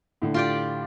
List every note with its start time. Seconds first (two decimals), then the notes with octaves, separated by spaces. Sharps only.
0.22 A2 D3
0.34 F4 G4 D5